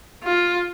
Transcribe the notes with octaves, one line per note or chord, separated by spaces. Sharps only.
F4